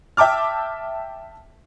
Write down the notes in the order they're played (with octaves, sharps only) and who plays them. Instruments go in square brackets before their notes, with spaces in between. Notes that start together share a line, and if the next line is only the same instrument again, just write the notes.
[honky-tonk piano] E5 G5 A5 D6 F6